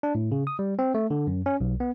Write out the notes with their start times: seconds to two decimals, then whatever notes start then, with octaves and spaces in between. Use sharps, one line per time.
0.03 D4
0.15 A2
0.32 C#3
0.47 D#6
0.59 G3
0.79 C4
0.95 A3
1.11 D3
1.27 F#2
1.46 C#4
1.61 B1
1.80 B3